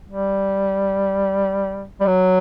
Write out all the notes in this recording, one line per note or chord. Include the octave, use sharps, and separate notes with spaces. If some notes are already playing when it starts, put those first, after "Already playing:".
G3
G3
F#3